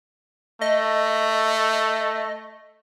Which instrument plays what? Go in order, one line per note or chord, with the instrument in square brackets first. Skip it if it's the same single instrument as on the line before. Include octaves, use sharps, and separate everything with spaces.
[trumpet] A3 [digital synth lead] D#5